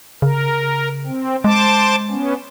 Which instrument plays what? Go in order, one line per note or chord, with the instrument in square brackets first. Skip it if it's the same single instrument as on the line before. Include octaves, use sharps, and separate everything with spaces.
[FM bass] C#3 [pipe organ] A#4
[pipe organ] C4
[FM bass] G#3 [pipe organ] C5 A5 D6
[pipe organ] B3 C#4